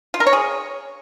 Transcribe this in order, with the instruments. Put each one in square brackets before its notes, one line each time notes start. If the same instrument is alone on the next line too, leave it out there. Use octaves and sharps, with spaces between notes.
[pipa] F4
A#4
C#5
G#4